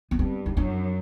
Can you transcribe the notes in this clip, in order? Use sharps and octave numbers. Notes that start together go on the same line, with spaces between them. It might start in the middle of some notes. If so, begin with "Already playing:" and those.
B3
G2 C4
D#4
F#2 D4